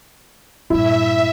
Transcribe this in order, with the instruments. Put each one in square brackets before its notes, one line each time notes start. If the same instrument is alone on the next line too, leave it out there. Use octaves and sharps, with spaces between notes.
[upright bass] G2 A#2 [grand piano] E4 [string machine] E5